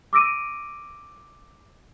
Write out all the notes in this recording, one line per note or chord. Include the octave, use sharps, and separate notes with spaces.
D6 E6 A#6 D7 D#7